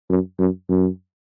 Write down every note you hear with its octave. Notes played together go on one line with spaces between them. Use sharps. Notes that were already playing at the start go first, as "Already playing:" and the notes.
F#2
F#2
F#2